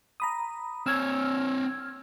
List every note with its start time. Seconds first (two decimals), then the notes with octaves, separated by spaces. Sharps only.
0.20 A#5 B5 D#6
0.86 C4 C#5 E6 F6 G#6